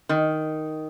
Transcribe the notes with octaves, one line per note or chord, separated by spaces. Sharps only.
D#3